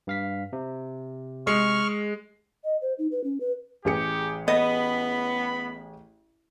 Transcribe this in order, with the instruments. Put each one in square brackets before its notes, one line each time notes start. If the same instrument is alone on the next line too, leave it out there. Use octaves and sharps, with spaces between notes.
[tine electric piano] G2 F5 B6
C3
[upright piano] G#3 [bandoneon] C#6 F6
[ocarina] D#5
C5
D#4
B4
C#4
B4
[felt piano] A1 G#4 C#7 [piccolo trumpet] G4
[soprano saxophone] B3 [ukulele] D#5 [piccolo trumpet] B5